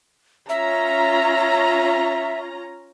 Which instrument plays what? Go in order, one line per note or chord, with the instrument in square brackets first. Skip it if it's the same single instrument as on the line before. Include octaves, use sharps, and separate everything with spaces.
[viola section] C#4 F4 A#5 [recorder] E5